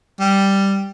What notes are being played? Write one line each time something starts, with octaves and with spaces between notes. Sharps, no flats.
G3